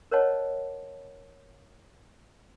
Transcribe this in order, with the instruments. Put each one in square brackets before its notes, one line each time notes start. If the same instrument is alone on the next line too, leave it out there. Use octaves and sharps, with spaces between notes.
[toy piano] A#4 C5 C#5 D#5 F#5 A5